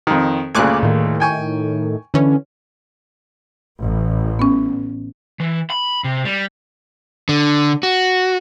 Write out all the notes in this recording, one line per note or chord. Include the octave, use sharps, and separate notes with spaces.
F2 D#3
D2 A#2 C#3 G#5 D6 F#6
A2 D#3
G5 G#5 C#6
D3 E3 C#4
A1
B3 C#4
E3
B5
C3
G3
D3
F#4